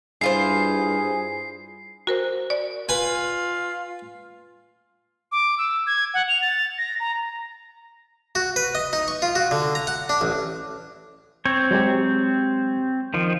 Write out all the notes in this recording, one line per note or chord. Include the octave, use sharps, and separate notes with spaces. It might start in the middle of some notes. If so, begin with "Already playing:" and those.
G2 E4 F4 G#4 C5 C7
F#4 A#4 C5
D5
F4 B4 G#5
D6
E6
G#6
F#5
F7
A6
A#6
A#5
F#4
B4
D#5
D#4
C#6
F4
F#4
D3
A#5
F#5
D4
A1
C4 C#5
F#3 G#3 G4
D#3 F3